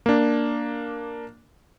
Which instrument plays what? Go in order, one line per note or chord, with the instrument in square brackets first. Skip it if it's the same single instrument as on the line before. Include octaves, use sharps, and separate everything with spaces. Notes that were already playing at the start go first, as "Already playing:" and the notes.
[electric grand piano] A#3 D4